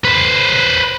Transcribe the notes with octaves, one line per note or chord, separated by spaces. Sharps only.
B4 C5